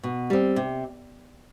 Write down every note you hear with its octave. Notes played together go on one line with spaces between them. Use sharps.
B2
G3 C4
C3